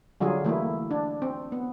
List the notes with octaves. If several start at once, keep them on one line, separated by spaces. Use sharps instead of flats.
D3 F#3 G3 F4 G#4
E3 A3 A#3 E4
D4
C4
B3